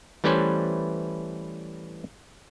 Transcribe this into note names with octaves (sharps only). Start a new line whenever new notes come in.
E3 G3 A3 C#4 B4 C5